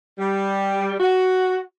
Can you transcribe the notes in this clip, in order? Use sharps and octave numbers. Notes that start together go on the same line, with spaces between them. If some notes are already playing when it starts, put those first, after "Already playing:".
G3
F#4